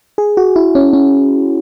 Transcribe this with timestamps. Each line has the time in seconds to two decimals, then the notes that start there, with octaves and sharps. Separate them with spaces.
0.18 G#4
0.37 F#4
0.56 E4
0.75 C#4
0.93 C#4